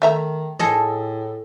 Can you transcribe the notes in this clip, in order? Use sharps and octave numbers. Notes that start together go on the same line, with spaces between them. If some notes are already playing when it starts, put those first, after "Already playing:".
D#3 A3 E5 A#5
A2 G#4 A4 D#5